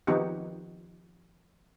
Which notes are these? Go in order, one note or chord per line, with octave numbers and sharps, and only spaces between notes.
D#3 F3 B3 D#4 F#4 G4